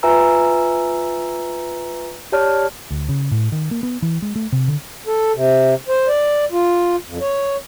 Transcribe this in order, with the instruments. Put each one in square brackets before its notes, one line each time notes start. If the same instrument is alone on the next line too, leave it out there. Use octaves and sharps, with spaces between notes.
[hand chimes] F4 B4 E5 G#5 A#5 E6
G4 C#5 D5 A5 F6
[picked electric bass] D2
C#3
A2
D#3
A#3
B3
E3
G#3
A3
C3
D3
[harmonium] A4
C3
C5
D5
F4
F2
C#5